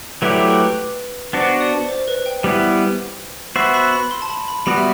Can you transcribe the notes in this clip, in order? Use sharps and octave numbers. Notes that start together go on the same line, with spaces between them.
F#3 A3 E4 G4 B4 D5
B4
B3 D4 F#4 C5
D5
C5
B4
G5
G3 B3 E4
B3 F#4 C5 E5 B5
B5
B5
C6
A5
B5
B5
G3 B3 F#4 B5
E5